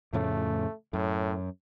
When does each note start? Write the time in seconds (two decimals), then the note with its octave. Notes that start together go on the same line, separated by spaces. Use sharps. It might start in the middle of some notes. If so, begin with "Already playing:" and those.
0.13 F2 A2 C#3 A3
0.93 F#2 A2